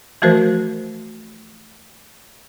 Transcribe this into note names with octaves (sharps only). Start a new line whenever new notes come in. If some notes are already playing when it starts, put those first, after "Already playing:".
E3 F3 A3 F#4 A#4 C5